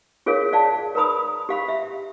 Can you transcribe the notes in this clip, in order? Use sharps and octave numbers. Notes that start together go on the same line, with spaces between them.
F4 G#4 A#4 C#5 F5
D5 F5 A5
A#4 B4 A#5 B5 D#6
G4 F5 B5
E5